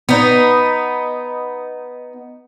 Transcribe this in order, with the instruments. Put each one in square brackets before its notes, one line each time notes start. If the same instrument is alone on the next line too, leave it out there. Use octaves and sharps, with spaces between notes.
[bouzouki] B3 D#4